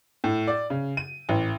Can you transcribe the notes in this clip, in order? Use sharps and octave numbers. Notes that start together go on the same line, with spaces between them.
A2
D5
C#3
D#7
A1